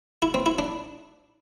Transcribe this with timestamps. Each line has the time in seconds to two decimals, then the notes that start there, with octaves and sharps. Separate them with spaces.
0.22 E4
0.34 C4
0.46 E4
0.59 D4